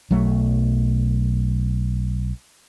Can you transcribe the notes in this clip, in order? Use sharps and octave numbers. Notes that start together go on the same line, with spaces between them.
B1 F#3 A3